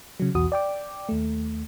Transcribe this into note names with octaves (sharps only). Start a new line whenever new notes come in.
C#3 F#3
B1 E2 F#4 D#6
D5 G5 D6
D#2 A3